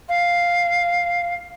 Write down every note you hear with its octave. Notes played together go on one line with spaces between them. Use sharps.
F5